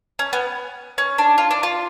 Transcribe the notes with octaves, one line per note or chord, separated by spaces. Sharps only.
C#4
B3
C#4
D4
F4
D4
F4